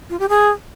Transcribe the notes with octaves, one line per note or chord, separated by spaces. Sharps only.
F4
G4
G#4